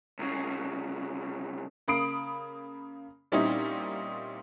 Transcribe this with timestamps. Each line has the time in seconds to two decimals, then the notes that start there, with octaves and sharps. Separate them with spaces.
0.19 C2 C#3
1.88 C#3 A#3 B5 D#6 C7 D7
3.32 A#2 G3 C4 C#4 D#4 E4